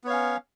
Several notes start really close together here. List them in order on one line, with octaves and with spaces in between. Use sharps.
B3 C#5 F5 C#4